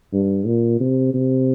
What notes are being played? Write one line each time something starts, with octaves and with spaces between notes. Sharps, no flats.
G2
A#2
C3
C3